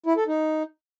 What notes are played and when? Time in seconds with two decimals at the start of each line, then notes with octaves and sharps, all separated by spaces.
0.06 E4
0.17 A4
0.27 D#4